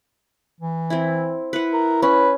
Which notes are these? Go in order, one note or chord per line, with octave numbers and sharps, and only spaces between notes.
E3
C4 E4
E4 B4 F#5
A#4
C#4 B4